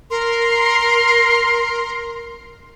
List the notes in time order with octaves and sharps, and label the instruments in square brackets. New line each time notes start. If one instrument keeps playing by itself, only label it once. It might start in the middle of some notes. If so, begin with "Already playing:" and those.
[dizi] A#4 [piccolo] C6